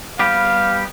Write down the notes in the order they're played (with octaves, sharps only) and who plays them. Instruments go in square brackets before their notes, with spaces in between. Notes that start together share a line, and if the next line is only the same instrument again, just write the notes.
[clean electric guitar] G3 B3 G4 [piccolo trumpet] F5